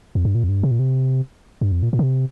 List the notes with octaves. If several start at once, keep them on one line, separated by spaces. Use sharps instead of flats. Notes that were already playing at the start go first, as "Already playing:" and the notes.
F2
G2
A#2
F2
G2
C3
A#2
C3
G2
F2
A#2
A#2
D3
C3